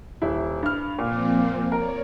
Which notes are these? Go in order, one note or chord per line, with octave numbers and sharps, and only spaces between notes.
D#1 E4
G2 F6
A#2 F3 A#3 C4
A#4 C#5 D5